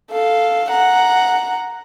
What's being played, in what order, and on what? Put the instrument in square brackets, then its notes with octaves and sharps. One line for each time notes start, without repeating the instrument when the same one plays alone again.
[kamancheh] A4 F5
F#5 A#5